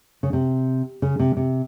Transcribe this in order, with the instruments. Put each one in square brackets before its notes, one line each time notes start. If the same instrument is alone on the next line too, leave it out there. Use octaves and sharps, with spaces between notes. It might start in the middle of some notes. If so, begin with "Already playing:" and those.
[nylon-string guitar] C#3
C3
C#3
C3
C3